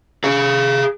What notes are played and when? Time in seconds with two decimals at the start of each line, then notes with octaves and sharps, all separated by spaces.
0.24 G#4 F5